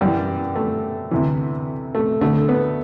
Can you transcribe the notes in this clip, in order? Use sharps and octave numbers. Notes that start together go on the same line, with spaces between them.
F#2 E3 G3
A3
D2 C3 E3
A3
D2 D3 A3
B3